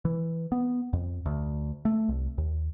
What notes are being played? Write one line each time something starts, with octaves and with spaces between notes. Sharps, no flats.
E3
B3
F2
D2
A3
C2
D#2